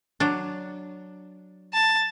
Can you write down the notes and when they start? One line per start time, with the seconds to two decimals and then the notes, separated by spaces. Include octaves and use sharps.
0.20 F#3 D4
1.73 A5